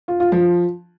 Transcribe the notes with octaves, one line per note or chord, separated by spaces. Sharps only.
F4
F4
F3